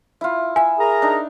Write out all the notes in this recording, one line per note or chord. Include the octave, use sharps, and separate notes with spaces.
E4 F4
E5 G#5
G#4 A#4 A#5
D4 D#4